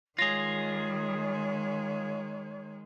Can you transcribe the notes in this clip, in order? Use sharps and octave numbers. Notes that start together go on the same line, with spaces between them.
D#3 G#3 F4 G#4 C#5 A#6 F7